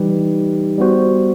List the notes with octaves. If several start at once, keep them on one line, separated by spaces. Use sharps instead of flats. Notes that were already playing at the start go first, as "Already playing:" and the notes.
Already playing: E3 G3 D#4 G4 B4
G3 B3 F#4 C5